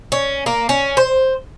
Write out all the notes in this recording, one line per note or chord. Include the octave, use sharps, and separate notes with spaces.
C#4
A#3
C#4
C5